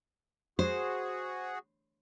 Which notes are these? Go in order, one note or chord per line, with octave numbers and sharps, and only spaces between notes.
F#4 G#4 C5